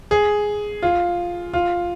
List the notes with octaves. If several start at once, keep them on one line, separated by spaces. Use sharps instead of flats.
G#4
F4
F4